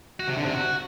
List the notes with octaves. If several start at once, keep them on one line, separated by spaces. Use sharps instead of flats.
F#4
C3
D3
C3
F#4